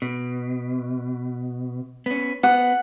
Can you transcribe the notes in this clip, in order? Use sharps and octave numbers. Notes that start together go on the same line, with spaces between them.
B2
B3 C#4
B3 F#5